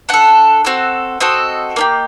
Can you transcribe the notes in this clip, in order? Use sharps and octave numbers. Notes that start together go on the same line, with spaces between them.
D4 A4 F#5
C4 F#4 A4
C4 F#4 A4 D#5
A#3 D4 G4